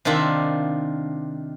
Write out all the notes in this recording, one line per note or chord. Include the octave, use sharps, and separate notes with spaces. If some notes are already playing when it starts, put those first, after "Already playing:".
C3 D#3 D4 F4 E5